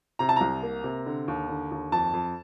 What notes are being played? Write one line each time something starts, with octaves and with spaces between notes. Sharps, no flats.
C3 A#5
A5
C2 A#5
A#3
C3
D3
D#2
D3
D#2
F2 A5
F2